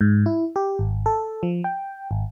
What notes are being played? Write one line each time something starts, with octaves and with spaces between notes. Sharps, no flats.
G#2
E4
G4
G#1
A4
F3
G5
G#1